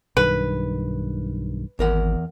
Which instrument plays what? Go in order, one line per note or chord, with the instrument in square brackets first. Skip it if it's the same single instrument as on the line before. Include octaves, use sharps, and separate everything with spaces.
[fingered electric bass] B1 G2 D#3 [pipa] B4
[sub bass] G#1 [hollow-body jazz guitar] E2 A#4 F#5